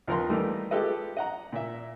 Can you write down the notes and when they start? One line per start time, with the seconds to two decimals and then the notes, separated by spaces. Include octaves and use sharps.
0.07 D#2 F3 B3 A#4 B4 C6
0.29 D#3 E3 G3 A3 A#3
0.71 G#3 F4 G4 A4 B4 D#5
1.17 D#5 F#5 A#5
1.52 A#2 E5